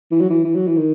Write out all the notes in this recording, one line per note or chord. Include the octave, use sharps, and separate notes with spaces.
E3
F#3
E3
E3
F#3
E3
D#3